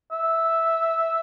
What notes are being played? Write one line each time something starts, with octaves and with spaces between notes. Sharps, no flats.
E5